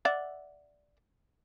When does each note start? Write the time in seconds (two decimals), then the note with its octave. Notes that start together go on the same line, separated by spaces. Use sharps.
0.05 D5 E5 F#5